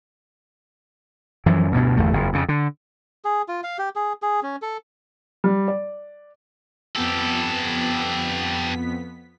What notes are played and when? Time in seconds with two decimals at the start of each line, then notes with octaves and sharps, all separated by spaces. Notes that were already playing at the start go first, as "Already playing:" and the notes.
1.46 F#2 E3 F3
1.72 D2 G2 B2
1.97 G1 E2 A3
2.13 F#1 F2
2.33 F2 C#3
2.49 D3
3.25 G#4
3.48 F4
3.63 F5
3.79 G4
3.96 G#4
4.22 G#4
4.43 C#4
4.62 A4
5.44 G3
5.68 D5
6.95 F2 B3 G4 A4 B6